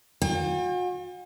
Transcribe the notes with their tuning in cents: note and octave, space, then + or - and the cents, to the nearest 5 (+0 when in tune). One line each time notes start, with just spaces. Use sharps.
F#4 -45 G5 +40